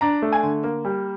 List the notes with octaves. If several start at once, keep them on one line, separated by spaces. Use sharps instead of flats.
D4 A#5
A3
G#5
D3
A#3
G3